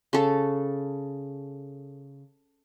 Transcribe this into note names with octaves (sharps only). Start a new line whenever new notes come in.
C#3 A4